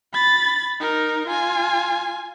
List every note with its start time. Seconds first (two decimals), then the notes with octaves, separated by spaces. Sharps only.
0.14 B5 A6
0.80 D#4 A#4
1.27 F4 G#5